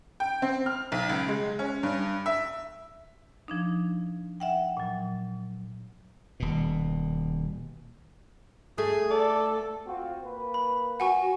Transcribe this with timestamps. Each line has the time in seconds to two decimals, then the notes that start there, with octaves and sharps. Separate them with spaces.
0.20 G5
0.42 C4
0.66 F6
0.92 B1
1.09 C#2
1.28 G#3
1.59 C#4
1.83 G2
2.26 E5
3.48 F3 D4 D#4
4.40 E5 F#5 G5
4.77 A#2 F#3
6.40 D#1 B2
8.78 A3 G#4
9.11 A4 D5
9.86 C4 F4 F#4
10.23 A#3 B4
10.54 B5
11.00 F#4 F#5 G#5 C#6